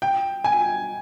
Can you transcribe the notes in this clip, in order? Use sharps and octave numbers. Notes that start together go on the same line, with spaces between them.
G5
G#5